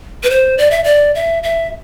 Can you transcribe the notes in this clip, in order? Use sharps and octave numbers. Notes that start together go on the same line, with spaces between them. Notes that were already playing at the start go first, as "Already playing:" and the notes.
B4
C5
D5
E5
D5
E5
E5